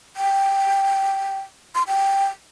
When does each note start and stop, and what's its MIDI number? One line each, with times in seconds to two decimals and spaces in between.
0.16 1.38 79
1.75 1.83 84
1.88 2.25 79